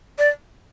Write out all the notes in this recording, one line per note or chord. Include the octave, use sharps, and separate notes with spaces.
D5